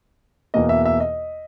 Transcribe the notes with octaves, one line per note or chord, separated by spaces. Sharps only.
E2 B2 A#3 D#5
E5
E5
D#5